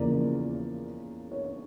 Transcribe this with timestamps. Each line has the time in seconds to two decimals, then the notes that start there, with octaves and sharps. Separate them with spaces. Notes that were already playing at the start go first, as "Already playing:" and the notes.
Already playing: E2 C#3 F3 A#3 D5
1.32 C#5